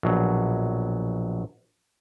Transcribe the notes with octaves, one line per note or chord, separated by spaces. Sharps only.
A#1 B2 F#3